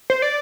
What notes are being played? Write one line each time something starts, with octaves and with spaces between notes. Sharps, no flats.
C5
D5